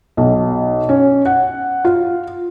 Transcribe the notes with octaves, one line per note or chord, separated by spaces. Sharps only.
B1
C#4
F#5
F4